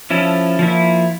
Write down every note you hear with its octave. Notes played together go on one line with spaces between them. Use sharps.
F3 C#4 E4 A4
F3 A#3 E4